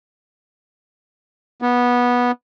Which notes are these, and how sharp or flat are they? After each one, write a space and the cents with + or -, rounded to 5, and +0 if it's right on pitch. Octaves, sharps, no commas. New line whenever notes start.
B3 -15